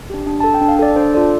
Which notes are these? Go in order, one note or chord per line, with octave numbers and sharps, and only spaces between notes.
D4 G4
D4
A4 A5
G5
D4
F5
A4 D5
D4 C5
F4 A4 D5